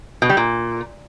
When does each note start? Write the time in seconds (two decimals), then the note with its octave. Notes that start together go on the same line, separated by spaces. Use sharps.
0.22 B2
0.29 G3
0.37 A#2